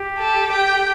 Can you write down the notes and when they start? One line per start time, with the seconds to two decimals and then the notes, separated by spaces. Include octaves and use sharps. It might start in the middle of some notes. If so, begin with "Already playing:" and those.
Already playing: G4
0.18 A4
0.52 G5